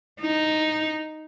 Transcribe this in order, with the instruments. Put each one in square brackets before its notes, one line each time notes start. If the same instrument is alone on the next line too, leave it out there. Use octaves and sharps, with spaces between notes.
[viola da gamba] D#4